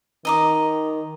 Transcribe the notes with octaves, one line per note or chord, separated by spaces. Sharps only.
D#3 D#5 A#5 D6